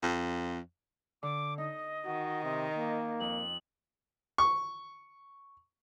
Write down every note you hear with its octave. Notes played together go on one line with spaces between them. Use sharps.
F2
D3 D6
D#4 D#5
D#3 F#4
C3
A#3
F2 D#6 F#7
C#6